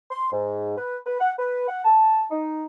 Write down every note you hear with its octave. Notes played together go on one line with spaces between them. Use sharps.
C6
G#2
B4
B4
F#5
B4
F#5
A5
D#4